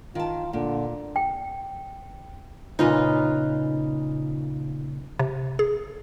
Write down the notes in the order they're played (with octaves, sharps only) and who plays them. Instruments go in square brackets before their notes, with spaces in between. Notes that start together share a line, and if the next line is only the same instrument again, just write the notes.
[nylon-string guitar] D#3 A5 [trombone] F4
[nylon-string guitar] A#2 [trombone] D3
[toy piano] G5
[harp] A#2 C#3 [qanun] D#4 F4 B4
[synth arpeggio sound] C3
G#4